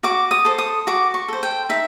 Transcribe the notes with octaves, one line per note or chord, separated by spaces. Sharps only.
F#4 D6
D#6
A4 C5
D#6
F#4 D6
C#6
A4 C5
G5
D#4 E5